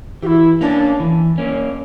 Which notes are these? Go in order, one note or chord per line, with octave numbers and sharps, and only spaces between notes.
E3 E4 G4
A#3 C#4 D4
E3
A#3 C#4